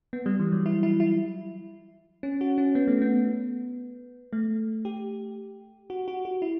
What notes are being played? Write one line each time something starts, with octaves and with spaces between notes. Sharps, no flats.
B3
G3
E3
F#3
E4
E4
E4
C#4
F#4
C#4
B3
A3
B3
A3
G4
F#4
F#4
F#4
E4